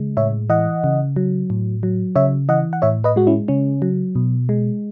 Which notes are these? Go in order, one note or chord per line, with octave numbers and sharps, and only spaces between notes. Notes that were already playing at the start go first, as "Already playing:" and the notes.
Already playing: C#3 G#3
A2 C#5 E5
E3 D#5 F#5
C#3
F#3
A2
F#3
C#3 C#5 E5
E3 D#5 F#5
F#5
A2 C#5 E5
B4 D#5
G#3 F#4
C#4 E4
C#3 C#4
F#3
B2
G#3